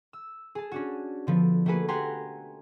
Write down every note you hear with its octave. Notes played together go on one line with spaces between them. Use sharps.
E6
G#4 A5
C#4 D4 F#4
D3 F3 B3
A3 A#3 F#4 G#4 B4
G4 B4 F#5 G#5 A#5 C6